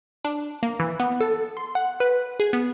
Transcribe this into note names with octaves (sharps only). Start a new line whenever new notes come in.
D4
A#3
E3
B3
A4
C6
F#5
B4
G#4
B3